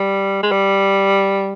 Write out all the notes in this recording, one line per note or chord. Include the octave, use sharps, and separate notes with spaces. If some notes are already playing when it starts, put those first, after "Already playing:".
Already playing: G3
G#3
G3